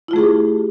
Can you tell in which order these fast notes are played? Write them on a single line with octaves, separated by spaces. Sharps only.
E4 F4 A3 G#4 G4